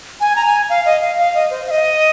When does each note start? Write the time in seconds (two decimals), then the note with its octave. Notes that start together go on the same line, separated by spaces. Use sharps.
0.21 G#5
0.36 A#5
0.45 G#5
0.69 F5
0.85 D#5
1.01 F5
1.18 F5
1.34 D#5
1.51 C5
1.66 F5
1.71 D#5